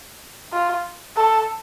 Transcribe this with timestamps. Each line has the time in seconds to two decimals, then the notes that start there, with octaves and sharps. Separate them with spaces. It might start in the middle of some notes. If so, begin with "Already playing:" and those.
0.52 F4
1.17 A4